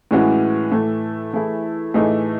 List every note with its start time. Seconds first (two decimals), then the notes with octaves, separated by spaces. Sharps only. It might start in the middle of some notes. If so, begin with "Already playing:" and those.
0.11 A2 E3 G#3 C#4 F#4
0.72 A2 E3 A3
1.33 E3 A3 E4 G#4
1.94 A2 E3 A3 D#4 G#4